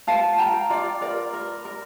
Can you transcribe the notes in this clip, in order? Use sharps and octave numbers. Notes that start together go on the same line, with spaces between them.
F4 F5 A5
F4 G5 A#5
F4 D5
A#4 D5
A#4
A#4